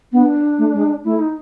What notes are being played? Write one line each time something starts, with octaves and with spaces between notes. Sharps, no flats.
B3 D4
A3
G#3
A3 E4
D#4